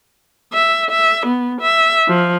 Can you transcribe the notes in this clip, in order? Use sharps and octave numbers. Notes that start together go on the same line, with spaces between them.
E5
E5
B3
E5
F3